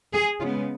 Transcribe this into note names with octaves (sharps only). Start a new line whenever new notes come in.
G#4
C#3 G#3 B3 F4